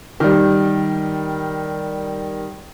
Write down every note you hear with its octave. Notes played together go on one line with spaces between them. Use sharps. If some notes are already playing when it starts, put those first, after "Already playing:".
D#3 G3